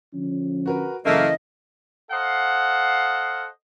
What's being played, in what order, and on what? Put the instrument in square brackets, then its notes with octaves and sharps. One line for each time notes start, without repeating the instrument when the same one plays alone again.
[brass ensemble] D3 F3 C#4
[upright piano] F#4 A#4 B4
[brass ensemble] F#1 [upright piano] C#3 E3 [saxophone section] A3 A#3 [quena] D#5
[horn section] A4 C5 D#5 F5 F#5